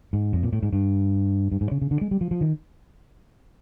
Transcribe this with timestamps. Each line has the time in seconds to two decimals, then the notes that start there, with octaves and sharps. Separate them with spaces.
0.13 G#2
0.33 F2
0.43 A#2
0.53 A2
0.63 G#2
0.73 G2
1.52 G2
1.61 G#2
1.71 C#3
1.82 C#3
1.91 D3
2.01 G#3
2.11 G3
2.21 F3
2.31 F3
2.41 D#3